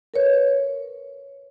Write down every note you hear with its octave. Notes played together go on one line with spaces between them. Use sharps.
A#4 B4 C#5